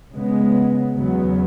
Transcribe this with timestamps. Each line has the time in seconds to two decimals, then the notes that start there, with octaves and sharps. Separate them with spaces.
0.15 C#3 G#3 B3
0.95 E2 C#3 F#3 B3